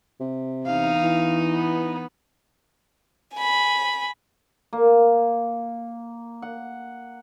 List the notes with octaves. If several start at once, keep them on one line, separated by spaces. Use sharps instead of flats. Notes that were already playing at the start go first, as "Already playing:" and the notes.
C3
E2 D#4 F5
E3
B3
G#5 B5
A#3
F#5